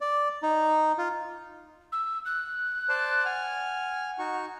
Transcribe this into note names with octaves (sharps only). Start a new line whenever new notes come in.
D5
D#4
F4
E6
F#6
C5 D5 A5
F#5 G#5 F6
D#4 F#4 C#6